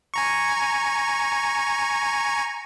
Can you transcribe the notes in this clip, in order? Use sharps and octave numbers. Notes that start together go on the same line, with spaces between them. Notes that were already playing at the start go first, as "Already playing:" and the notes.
G#5 A#5 C#6